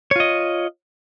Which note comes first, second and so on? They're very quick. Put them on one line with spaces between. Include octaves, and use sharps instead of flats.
C#5 F4 D#5